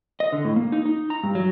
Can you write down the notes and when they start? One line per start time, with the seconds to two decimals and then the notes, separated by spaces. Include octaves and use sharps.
0.20 D#5
0.32 D3
0.45 A2
0.56 A#3
0.72 D#4
0.85 D#4
1.10 A#5
1.23 G2
1.35 F#3